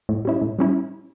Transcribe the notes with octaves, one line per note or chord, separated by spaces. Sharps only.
A2
G3 C#4 E4
A2
G3 C#4 E4